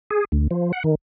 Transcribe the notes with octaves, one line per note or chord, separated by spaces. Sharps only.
G#4
D2
F3
F#5
D#3